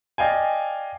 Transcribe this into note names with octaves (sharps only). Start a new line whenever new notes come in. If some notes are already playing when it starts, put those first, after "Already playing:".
D5 D#5 F5 G5 G#5